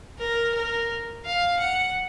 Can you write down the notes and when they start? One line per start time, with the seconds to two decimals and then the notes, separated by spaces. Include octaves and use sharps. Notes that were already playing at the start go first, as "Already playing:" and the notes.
0.18 A#4
0.54 A#4
1.25 F5
1.59 F#5